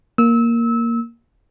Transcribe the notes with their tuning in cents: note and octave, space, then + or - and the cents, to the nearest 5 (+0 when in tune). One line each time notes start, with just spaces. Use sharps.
A#3 +0 E6 -25